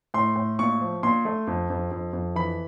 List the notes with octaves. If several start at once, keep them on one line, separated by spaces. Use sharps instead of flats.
A2 C6
A2
A#2 C#6
F3
A#2 C6
A3
F2
F2
F2
F2
E3 B5